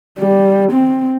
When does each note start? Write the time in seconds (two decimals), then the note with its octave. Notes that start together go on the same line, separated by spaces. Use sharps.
0.19 G3
0.72 C4